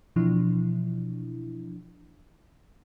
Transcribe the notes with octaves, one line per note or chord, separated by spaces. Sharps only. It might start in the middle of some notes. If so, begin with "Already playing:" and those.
B2 E3 F3 D4 E4